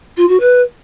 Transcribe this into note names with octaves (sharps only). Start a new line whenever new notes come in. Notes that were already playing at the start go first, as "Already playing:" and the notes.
F4
F#4
B4